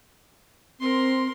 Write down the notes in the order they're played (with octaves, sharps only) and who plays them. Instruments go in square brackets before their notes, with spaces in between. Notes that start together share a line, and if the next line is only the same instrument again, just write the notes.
[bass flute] C4 [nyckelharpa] A#4 C6